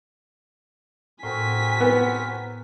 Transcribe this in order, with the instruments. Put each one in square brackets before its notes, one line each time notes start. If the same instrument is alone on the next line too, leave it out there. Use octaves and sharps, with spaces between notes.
[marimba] A2 [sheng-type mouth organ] C4 F#4 A#4 [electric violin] G#5 B6
[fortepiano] B3